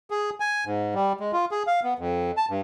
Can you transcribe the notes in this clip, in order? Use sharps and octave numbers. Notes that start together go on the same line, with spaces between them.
G#4
G#5
G#2
G3
G#3
F4
G#4
F5
B3
F2
A5
G2